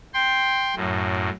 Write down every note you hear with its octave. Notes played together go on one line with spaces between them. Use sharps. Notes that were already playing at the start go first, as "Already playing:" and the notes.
G5 C6
F#2 A2